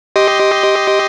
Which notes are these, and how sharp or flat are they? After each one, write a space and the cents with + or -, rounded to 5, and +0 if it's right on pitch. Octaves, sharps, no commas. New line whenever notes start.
G4 +0 D#5 +5 C6 +0